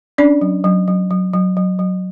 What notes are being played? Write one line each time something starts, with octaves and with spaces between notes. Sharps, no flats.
C#4 D4 D5
F#3
F#3
F#3
F#3
F#3
F#3
F#3